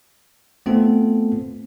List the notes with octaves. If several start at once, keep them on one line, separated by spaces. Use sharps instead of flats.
A3 B3 C4 F4 A4